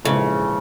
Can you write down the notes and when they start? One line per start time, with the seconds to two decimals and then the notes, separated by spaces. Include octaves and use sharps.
0.05 A#1 G#2 C#3 E3 G#3